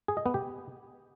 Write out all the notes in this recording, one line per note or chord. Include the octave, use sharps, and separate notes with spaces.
G#4
D#5
B3
G4